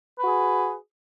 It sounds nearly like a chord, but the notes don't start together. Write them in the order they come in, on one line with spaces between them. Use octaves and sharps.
B4 F#4 G#4